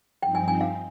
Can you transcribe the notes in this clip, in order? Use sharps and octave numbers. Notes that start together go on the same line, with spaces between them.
G2 F3 C4 D#4 G5
G#5
G#5
F5